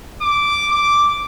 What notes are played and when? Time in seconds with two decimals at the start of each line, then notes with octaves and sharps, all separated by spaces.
0.22 D6
0.72 D6